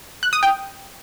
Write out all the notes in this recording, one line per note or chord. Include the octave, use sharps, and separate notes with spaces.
F#6
D#6
G5